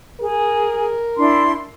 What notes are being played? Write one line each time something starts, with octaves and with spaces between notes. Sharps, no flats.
G#4 A#4
D4 E4 C6